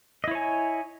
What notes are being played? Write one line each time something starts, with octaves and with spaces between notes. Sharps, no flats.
E4 C#5 D#5 G#5